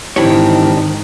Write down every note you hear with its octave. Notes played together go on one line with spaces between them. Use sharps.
G#2 D#3 E3 C4 D4 E4 G4 C#5